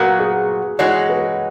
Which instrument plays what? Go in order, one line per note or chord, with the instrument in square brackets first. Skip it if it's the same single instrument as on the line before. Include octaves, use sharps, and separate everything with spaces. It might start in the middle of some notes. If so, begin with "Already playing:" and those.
Already playing: [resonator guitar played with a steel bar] A#2 F#3 B3 F#4 [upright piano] A#4
[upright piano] G#4
[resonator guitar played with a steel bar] E3 G#3 D#4 F#4 [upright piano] C#5
[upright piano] B4